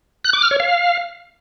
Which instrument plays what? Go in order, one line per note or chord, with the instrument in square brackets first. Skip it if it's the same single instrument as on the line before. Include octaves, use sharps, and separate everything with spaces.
[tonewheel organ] F#6
D6
F6
C#5
F5